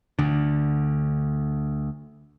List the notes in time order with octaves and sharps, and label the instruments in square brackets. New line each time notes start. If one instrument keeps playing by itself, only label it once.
[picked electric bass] D2 D3